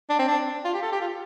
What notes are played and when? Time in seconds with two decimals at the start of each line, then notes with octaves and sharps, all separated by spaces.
0.10 D4
0.19 C4
0.28 D4
0.65 F4
0.74 G4
0.82 A4
0.92 G4
1.01 F4